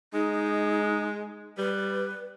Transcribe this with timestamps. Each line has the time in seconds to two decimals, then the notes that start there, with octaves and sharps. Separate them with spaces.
0.14 G#3 D#4
1.58 G3 B4